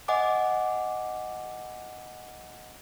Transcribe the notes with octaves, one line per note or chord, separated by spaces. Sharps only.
D#5 F#5 G#5 D6